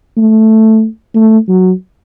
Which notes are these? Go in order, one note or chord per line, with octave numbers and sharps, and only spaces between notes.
A3
A3
F#3